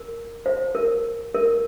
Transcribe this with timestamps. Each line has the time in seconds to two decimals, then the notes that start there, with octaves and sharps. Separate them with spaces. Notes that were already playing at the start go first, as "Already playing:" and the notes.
Already playing: A#4
0.46 C5
0.75 A#4
1.35 A#4